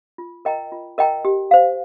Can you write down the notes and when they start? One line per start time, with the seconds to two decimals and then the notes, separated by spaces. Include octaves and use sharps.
0.18 F4
0.45 A#4 D#5 G5 A#5
0.72 F4
0.98 A#4 D#5 G5 A#5
1.25 G4
1.51 C5 F5